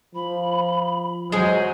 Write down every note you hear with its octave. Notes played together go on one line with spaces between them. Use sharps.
F3 B5
F#3 G#3 G#4 C5